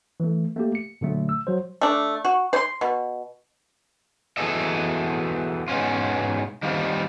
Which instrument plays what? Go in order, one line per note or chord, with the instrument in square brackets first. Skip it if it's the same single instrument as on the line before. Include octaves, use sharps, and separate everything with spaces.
[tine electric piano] E3 A3
A3 A#3 G4
C#7
A#2 D3 F#3 A3
E6
F#3 C5
[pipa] A3 D4
F#4
C5 C6
B2
[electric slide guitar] B2 E3 G#4 A4 D#5 E5
G#2 B2 B3 C#4 F4
D#3 G3 C4 F4